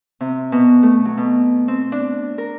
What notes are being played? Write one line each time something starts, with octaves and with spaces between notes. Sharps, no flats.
C3
B2
A3
F#3
B2
C4
D4
A#4